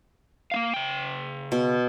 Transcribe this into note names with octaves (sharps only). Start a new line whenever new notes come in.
A#3 C4 F5
C#3 G5
B2